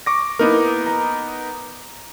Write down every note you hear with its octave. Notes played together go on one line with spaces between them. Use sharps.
C#6 D6 A#6
A#3 B3 D#4 E4 A#4
A#5